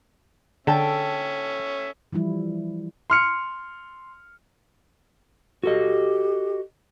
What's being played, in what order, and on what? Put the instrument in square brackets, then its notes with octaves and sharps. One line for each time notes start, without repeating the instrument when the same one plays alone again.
[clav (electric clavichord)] D3 [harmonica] C#4 E5 [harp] A4 G5 A5
[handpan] E3 F3 G3 E4
[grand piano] C6 F6 C#7
[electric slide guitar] F#4 A4 D#5 [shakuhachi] G4